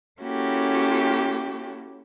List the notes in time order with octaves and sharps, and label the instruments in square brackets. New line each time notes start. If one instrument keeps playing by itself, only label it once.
[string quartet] A#3 C#4 E4 F#4 G4 A4